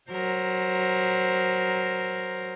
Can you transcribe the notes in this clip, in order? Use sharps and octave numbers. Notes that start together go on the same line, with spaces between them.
F#3 A#4 C5